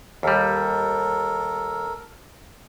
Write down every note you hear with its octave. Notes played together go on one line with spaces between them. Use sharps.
D#2 G3 A4 A#4